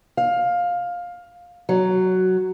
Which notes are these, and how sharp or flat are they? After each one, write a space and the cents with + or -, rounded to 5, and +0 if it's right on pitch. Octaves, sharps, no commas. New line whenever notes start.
F5 +15
F#3 +5